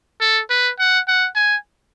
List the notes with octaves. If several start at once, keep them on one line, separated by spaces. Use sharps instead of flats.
A4
B4
F#5
F#5
G#5